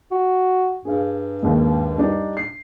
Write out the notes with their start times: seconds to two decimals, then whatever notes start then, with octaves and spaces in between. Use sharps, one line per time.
0.11 F#4
0.85 G2 G#4 F5
1.43 D#2 G#2
1.98 G3 D4 D#4
2.37 C7